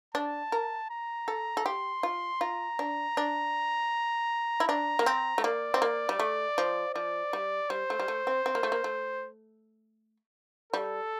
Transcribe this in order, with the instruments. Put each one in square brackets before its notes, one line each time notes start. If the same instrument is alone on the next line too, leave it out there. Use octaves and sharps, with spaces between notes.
[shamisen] D4 [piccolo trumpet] A5
[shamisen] A#4
[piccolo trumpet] A#5
[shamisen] A4
A4
[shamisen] G4 [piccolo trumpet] C6
[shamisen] F4
[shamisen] F4 [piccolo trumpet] A#5
[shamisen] D4
D4
E4
[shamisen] D4 [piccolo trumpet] A#5
[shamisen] A#3
C4
A3
[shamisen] A#3 [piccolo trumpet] D5
[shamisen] C4
A#3
G3
A3
F3
[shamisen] F3 [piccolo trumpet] D5
[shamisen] G3
[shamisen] G3 [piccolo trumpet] C5
[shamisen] A3
G3
A3
C4
C4
A#3
A3
A#3
A3
[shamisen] G3 [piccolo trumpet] A4